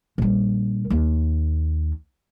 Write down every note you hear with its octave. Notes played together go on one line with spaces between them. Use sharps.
A#1 G3
D#2 A#3